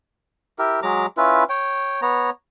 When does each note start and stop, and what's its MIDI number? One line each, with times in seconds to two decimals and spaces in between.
0.59 0.80 64
0.59 0.80 67
0.59 0.80 70
0.83 1.06 54
0.83 1.06 56
0.83 1.06 82
0.83 1.06 86
1.17 1.44 61
1.17 1.44 64
1.17 1.44 65
1.17 1.44 71
1.49 2.01 73
1.49 2.01 79
2.02 2.30 59
2.02 2.30 73
2.02 2.30 82